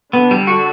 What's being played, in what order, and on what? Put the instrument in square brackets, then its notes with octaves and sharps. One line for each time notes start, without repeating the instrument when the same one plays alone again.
[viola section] D3 D4 [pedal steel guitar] B3
[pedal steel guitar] G3
F#4